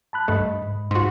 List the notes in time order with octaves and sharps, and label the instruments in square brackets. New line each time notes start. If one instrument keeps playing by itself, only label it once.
[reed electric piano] A5 B5 F#6
[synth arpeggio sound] G2 A3 [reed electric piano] D#5 B5
[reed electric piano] G#2
[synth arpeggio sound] G#2 F#4 [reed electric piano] F4 C6